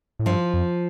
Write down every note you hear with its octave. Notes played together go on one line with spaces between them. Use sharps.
A2
G2 F3
F2